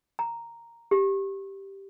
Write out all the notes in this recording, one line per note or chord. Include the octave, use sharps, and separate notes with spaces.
A#5
G4